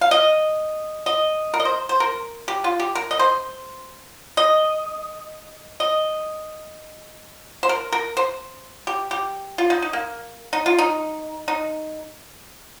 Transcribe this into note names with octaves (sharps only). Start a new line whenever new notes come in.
F5
D#5
D#5
A#4
D#5
C5
C5
A#4
G4
F4
G4
A#4
D#5
C5
D#5
D#5
C5
A#4
A#4
C5
G4
G4
F4
D#4
D#4
A#3
D#4
F4
D#4
D#4